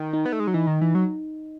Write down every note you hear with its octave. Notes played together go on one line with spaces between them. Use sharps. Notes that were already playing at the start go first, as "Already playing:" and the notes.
Already playing: D#3
D#4
B3
A3
G#3
F#3
E3 D#4
D#3
E3
F#3